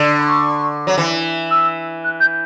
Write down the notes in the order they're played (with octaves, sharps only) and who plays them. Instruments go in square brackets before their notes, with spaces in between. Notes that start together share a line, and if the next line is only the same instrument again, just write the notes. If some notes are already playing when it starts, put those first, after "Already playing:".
Already playing: [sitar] D3
[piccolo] B5
C#6
[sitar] F#3
E3
[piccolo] E6
F#6
G6